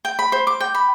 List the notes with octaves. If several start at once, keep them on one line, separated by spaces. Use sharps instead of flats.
G5
B5
C5
D6
G5
B5